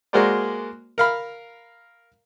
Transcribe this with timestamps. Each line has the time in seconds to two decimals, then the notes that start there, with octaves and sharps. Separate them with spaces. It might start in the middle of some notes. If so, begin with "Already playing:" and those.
0.13 G#3 A#3 F#4 A#4 C5 D5
0.98 A#4 F5 B5